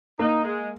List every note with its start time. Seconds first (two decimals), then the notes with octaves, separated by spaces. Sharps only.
0.19 A#3 D#4
0.44 G#3